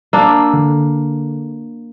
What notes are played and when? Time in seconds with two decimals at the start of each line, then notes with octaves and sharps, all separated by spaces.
0.13 A#3 D4 E6
0.54 D3